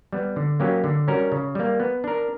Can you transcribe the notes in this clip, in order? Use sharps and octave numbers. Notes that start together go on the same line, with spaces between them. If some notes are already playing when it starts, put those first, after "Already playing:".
G3 B3
D3
F#3 A#3 C#4 G4
D3
G3 C#4 F#4 A#4
C#3
G3 A#3
B3
D4 A#4